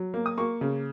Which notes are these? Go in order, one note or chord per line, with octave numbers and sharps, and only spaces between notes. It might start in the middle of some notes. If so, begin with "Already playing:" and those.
Already playing: F#3
A#3
D#6
A#3 C#6
C#3